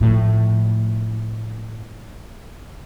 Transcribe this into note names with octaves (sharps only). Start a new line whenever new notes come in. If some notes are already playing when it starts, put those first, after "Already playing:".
A2 F3